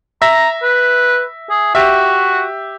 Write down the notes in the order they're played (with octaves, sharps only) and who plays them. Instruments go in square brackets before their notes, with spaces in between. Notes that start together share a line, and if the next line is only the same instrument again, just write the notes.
[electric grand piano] E5 A#6 [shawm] A#5
[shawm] B4
G#4
[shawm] F#4 [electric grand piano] G4 E5